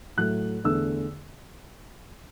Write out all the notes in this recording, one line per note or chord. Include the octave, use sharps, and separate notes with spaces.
A2 F#3 A3 F#6
E2 D3 A3 E6